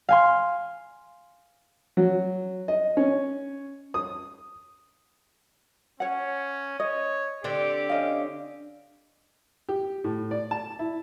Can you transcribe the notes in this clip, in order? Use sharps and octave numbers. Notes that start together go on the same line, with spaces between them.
F5 G#5 C6
F#3
D#5
C#4
D#6
C#4 C#5 F#5
C#5 D#5
D3 C4 D4 G4
C#4 D#5 F5
G4
A2
D5
A5
E4